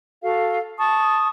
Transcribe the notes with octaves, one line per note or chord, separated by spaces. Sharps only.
F#4 A4 F5
A5 C#6 D#6